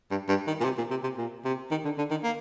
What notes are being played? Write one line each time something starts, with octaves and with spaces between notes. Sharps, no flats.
G2
G2
D#3
A#2
C3
A#2
C3
C3
A#2
C3
D#3
D3
D3
D#3
A#3